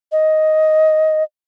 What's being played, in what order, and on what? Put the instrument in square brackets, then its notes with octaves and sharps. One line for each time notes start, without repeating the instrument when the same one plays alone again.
[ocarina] D#5